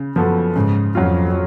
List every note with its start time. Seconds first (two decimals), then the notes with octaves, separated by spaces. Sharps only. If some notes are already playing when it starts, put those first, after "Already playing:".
Already playing: C#3
0.16 F#2 F3 B3 F#4 A4
0.55 G#2 C#3
0.95 F2 F#3 C#4 F4